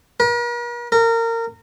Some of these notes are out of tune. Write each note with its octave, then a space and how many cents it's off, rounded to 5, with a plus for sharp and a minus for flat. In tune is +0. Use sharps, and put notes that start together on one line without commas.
A#4 +45
A#4 -25